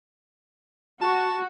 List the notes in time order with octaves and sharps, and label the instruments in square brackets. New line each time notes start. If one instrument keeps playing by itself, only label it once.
[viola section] F#4 [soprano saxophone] A5